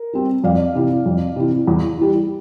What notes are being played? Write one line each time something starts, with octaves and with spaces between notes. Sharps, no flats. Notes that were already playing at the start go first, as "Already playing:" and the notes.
Already playing: A#4
G3 C4
F2 D5 F5
C3 E3
F2
C3 E3
E2
E3 G3